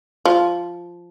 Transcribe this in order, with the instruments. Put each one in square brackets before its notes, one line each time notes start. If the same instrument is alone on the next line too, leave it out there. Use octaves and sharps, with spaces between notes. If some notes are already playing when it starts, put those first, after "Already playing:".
[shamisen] F3